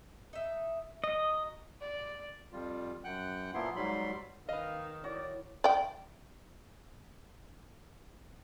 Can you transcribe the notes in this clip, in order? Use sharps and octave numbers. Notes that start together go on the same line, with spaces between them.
D#4 E5
F#3 D#5
D5
F2 G3 F4
F#2 F#5 G5 F#6
A#2 F3 A#3 B3 E4 C6
G#2 F#3 G3 B5 C6
D#3 B4 D#5 F5
E4 F#4 C#5 D5
D5 G5